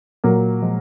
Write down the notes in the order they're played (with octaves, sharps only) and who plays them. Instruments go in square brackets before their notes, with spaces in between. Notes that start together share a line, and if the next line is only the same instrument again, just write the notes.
[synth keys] A#2 [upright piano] F#3 A#3
[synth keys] F3 G#3